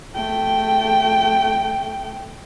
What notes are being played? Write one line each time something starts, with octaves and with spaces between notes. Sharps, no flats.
A3 G5